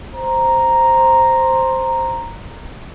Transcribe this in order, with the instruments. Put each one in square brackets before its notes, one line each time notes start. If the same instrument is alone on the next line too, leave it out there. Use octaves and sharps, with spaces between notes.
[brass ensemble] C5 A#5